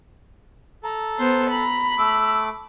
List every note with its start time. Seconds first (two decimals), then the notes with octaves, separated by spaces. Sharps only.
0.84 A4 A#5
1.19 B3 C5
1.51 A#5 B5
1.98 A3 D6 E6